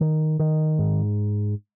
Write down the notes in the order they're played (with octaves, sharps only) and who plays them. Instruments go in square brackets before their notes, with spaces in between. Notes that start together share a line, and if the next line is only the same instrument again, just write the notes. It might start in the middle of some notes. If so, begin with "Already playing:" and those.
[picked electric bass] D#3
D#3
G#2